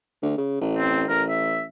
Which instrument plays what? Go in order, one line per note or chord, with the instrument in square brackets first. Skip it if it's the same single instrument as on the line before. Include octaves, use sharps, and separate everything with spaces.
[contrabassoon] D2
C#3
A1
[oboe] C4
[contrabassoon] A1 [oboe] A#4
[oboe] E5